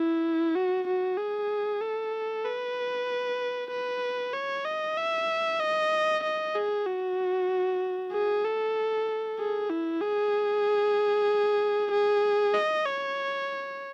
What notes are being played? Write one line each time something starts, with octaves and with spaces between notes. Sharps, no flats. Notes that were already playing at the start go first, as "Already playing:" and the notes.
Already playing: E4
F#4
F#4
G#4
A4
B4
B4
C#5
D#5
E5
D#5
D#5
G#4
F#4
G#4
A4
G#4
E4
G#4
G#4
D#5
C#5